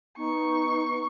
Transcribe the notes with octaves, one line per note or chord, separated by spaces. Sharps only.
B3 D#4 C#6